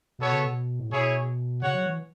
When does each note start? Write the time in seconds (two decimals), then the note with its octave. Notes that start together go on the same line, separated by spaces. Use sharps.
0.18 B2 B3 F#4 A4 C#5
0.31 C#3
0.44 B2
0.80 A2
0.90 B2 E4 G#4 C#5
1.62 C#3 F#4 C#5 F#5
1.74 F#3
1.86 E3